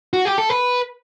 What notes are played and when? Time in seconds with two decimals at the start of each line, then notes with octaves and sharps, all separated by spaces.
0.13 F#4
0.25 G4
0.38 A4
0.49 B4